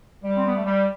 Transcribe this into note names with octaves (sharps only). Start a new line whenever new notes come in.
G3
C4
B3
A3
G3